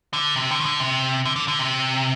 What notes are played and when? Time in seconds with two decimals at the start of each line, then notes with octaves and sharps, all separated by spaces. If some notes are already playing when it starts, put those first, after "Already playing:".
0.13 D3
0.36 C3
0.51 D3
0.60 D#3
0.65 D3
0.80 C3
1.25 D3
1.36 D3
1.48 D3
1.59 C3